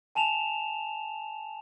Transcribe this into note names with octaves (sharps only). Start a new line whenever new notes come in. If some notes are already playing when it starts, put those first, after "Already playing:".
G#5 A5 E7 F7